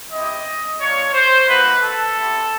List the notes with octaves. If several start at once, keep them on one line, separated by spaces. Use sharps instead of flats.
C4 E4 G4 D#5
A#3 D4 F4 C#5
C5
A#3 D#4 F#4 B4
A4
C4 E4 G4